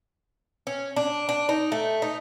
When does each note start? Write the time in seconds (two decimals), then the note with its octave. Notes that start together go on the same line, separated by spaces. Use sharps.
0.67 C#4
0.96 D4
1.29 D4
1.49 D#4
1.72 A3
2.02 D#4